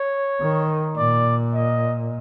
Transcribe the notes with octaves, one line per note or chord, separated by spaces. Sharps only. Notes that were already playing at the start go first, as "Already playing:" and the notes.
Already playing: C#5
D#3
A#2 D5
D#5